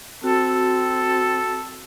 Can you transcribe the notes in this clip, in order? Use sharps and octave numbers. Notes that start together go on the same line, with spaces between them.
C4 F#4 A4